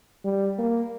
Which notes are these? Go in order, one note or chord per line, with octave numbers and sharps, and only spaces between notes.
G3
A#3